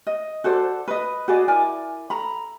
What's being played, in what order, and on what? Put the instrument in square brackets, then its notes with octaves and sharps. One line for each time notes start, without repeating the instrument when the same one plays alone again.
[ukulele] D#5
F#4 A4 C5 D5
B4 D#5
F#4 G#4 D5 D#5
E4 A#4 D5 G#5
A4 A#5 B5